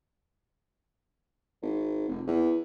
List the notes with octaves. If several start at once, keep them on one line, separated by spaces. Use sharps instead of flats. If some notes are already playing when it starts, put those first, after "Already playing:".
G#1
F1
E2